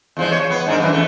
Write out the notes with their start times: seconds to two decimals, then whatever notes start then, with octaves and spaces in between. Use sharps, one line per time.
0.17 E2 F3 G#3
0.32 C#5
0.50 B3
0.66 G#2 D4 A#4
0.80 F#2 C#3 E3
0.93 F2 A3